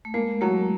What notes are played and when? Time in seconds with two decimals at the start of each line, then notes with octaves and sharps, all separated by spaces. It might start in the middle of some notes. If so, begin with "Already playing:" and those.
0.05 A3
0.14 G#3 A#3
0.41 F#3 A3